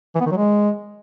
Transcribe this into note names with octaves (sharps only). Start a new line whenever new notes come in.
E3
B3
D#3
F#3
G#3